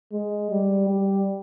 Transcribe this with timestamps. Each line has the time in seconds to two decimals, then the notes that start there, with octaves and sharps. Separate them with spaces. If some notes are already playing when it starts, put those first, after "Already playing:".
0.12 G#3
0.51 G3
0.89 G3